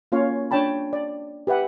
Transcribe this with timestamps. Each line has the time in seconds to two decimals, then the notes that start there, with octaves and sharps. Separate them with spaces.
0.12 A#3 C#4 F4 C#5 F5
0.51 D4 C#5 G5 A5 B5
0.93 D5
1.47 G4 B4 E5 F#5